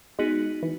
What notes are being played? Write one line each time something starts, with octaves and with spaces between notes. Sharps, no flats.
G#3 B3 D#4 F#4
E3